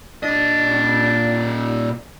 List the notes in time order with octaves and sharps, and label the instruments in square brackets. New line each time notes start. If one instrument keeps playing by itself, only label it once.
[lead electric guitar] A#2 D#5 [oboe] D4